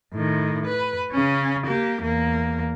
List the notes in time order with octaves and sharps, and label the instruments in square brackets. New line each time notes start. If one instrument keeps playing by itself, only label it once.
[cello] A2 D#3
B4
C#3 C#4
A#3 G4
E2 A#3